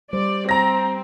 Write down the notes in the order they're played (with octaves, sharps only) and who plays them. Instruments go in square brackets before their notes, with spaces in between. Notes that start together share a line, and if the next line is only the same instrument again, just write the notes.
[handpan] G3 C5 [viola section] D5
[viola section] C4 [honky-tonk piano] A#5 A#6